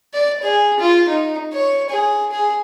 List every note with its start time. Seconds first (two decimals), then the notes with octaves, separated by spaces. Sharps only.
0.14 D5
0.43 G#4
0.80 F4
1.09 D#4
1.53 C#5
1.90 G#4
2.32 G#4